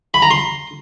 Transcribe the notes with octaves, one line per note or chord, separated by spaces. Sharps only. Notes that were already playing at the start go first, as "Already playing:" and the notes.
B5
A#5
C6